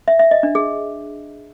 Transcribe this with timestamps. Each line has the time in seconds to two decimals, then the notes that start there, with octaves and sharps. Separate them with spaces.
0.08 E5
0.19 E5
0.31 D#5
0.43 D4
0.55 G#4